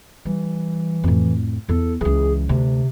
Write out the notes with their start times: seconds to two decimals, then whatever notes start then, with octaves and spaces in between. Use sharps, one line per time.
0.25 E3 G3
1.03 F2 A2
1.69 E2 E4 A4
2.01 C#2 E3 G#4
2.49 D2 C3